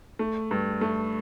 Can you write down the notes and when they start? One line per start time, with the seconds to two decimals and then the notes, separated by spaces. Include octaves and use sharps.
0.19 A3
0.51 G2
0.81 A3